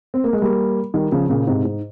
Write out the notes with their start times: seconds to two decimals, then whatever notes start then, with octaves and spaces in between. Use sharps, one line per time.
0.14 C4
0.24 A#3
0.33 G#3
0.42 G3 A#3
0.94 D#3 G3
1.12 C#3 F3
1.29 A#2 C#3
1.47 G#2 C3
1.65 G#2